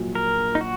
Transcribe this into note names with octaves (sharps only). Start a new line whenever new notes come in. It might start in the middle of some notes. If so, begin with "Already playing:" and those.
Already playing: A#1 A#2 F#3
A#4
D#4
F#4